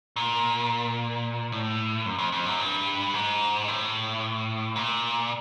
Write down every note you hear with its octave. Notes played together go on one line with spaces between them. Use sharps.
A#2
A2
F#2
F2
F2
F#2
G2
G#2
A2
A#2